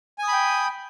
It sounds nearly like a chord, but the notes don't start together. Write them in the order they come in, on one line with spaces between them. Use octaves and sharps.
G#5 D#6 B5 G5